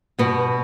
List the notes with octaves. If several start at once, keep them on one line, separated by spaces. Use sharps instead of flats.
G2 B2 B3